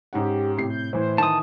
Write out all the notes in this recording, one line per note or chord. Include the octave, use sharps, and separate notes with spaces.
G#2 C#4 G4 F#5
A2 C3 G4 C7
G6
A2 E3 C5
D#3 E3 A5 D#6